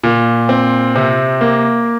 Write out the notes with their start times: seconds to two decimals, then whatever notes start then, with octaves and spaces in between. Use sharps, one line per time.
0.03 A#2
0.49 C4
0.96 C3
1.41 A#3